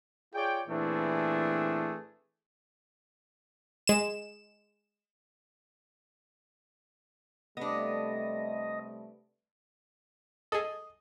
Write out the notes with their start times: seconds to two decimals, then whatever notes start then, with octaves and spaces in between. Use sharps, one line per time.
0.34 F4 G#4 C#5 D5 G5
0.68 A#2 E3 A3 C4 D4 G#4
3.87 G#3 E7
7.57 C3 G3 A3 B3 D4 D#5
10.52 G#4 A4 D#5